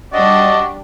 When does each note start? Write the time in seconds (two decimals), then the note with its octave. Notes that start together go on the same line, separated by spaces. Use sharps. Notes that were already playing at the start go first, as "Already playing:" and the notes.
0.13 G3 D4 F#4 G4 D5 D#5